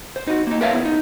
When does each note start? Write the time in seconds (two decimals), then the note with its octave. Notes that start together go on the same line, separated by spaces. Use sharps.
0.16 C5
0.27 D#4 F#4
0.47 A#3 D#4
0.61 A#4 B4 C#5 E5 F5 A5
0.73 B3 E4
0.85 D#4